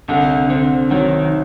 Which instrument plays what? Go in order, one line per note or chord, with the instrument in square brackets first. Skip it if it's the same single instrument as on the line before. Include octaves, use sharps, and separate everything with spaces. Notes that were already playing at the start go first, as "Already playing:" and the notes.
[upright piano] C2 [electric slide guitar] D3
[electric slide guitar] D3 [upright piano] C4
[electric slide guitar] D#3 [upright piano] F#3